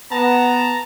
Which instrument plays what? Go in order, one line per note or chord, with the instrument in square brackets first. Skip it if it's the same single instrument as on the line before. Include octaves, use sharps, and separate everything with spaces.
[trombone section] B3 [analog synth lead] A5 [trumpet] A#5